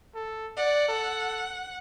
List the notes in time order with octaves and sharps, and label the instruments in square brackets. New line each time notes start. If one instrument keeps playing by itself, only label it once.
[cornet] A4
[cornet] D5 [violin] F#5
[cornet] A4